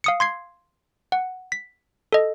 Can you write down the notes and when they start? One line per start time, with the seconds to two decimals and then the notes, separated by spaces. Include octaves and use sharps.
0.04 F5 D#6 C#7
0.20 C6 G#6 C7
1.12 F#5
1.52 B6
2.12 A4 D#5